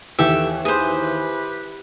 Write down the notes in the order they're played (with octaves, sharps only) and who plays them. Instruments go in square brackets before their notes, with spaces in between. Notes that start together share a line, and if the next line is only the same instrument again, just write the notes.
[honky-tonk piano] D#2 E3 [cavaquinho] G4 A4 E5
[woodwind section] E4 G4 B4 [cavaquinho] G#4 C5